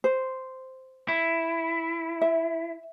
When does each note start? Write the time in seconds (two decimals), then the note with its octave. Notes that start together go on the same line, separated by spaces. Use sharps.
0.04 C5
1.08 E4
2.21 E5